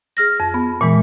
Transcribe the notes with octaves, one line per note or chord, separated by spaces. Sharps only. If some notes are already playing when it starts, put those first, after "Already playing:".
G#4 F6 A#6
F2
B3
A#2 E3 G#3